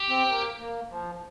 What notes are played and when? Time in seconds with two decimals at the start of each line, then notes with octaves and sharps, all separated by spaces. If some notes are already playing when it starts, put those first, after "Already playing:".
Already playing: G4
0.09 C4
0.29 A#3
0.59 A#3
0.90 F3